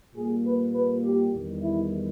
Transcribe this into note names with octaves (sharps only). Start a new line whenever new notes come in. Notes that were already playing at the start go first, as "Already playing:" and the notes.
A#2 G3 A#3 G#4
B4
B4
G4
E2 D#3 G3
E4